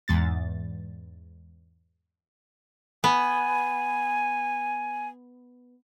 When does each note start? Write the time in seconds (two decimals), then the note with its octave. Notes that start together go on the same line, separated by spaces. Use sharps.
0.08 E2 G#2 A6
3.04 B3 G#5